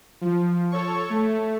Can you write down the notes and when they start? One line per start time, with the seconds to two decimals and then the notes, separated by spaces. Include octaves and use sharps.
0.21 F3
0.71 A4 C#5 C#6
1.10 A3